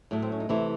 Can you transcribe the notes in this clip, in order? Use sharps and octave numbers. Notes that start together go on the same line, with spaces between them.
A2 F#3 A3
C4
C#4
D#4
C3 E3 A3 E4